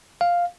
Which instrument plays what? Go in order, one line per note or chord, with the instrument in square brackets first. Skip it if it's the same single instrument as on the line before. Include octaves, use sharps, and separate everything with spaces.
[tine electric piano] F5